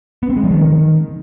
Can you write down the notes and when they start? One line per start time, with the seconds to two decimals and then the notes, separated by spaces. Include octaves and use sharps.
0.23 B3
0.30 C4
0.37 G#3
0.44 F3
0.51 D#3